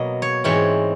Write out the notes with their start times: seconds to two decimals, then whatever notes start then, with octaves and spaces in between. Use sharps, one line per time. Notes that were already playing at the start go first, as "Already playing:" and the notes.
Already playing: B2 F#3 A#3 D#5
0.22 C#5
0.44 G#2 E3 G#3 C4 C#5